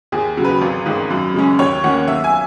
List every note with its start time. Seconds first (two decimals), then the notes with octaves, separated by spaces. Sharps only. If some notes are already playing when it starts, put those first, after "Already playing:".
0.12 D#2 G#4
0.37 C#3 F#3
0.44 B4
0.61 G#1
0.86 G#2 D#3
1.10 F#2
1.34 C#3 G#3 C#4
1.59 D#2 C#5
1.83 D#3 A#3 C#4 F#5
2.07 B1 E5
2.24 G#5